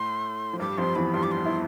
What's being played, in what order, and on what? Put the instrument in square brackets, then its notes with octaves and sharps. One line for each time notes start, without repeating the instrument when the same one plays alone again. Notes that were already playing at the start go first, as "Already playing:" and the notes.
Already playing: [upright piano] A2 A3 [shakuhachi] C6
[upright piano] F3
[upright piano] G2 G3 [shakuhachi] D6
[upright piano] F2 F3 [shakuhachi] C6
[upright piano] E2 E3 [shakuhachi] B5
[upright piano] G2 G3 [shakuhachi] C6
[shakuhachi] D6
C6
[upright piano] E4